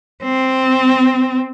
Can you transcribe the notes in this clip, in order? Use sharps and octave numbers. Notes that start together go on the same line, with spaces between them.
C4